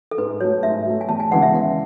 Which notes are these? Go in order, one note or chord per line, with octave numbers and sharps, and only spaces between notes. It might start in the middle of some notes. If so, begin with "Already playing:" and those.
A4
G#2 B4
F#3 A3 C#5
G#2 E5
F#3 A3
G#5
E2 A5
G#5
C#3 E3 G#3 B3 F#5
E5
E2